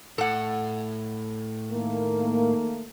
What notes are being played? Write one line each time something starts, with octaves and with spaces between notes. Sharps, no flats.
A2 A4 F#5
D#3 A3 A#3